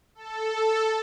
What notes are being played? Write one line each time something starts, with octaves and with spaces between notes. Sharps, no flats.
A4